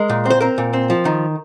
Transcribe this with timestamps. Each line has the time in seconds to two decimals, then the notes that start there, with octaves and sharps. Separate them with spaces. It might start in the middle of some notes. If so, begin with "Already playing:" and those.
Already playing: G#3 A#4
0.10 A#2
0.25 C4 C5
0.41 C4 A#4
0.58 A#2
0.73 C4
0.90 F3
1.05 D#3